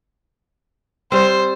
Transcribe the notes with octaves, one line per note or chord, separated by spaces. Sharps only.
G3 C4 C5